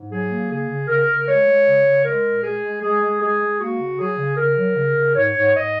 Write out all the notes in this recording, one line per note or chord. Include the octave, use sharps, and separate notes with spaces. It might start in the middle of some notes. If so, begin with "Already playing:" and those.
Already playing: G#2
F#3 G#4
A#3
C#3 G#4
C#3
C#3 A#4
C#3
G#3 C#5
G#3
C#3
C#3
G#3 A#4
A#2
G#3 G#4
G#3
G#3 G#4
G#3
G#3 G#4
G#3
A#3 F#4
C#3
F#3 G#4
C#3
C#3 A#4
F#3
C#3
C#3
G#2 C#5
G#2
G#2 D#5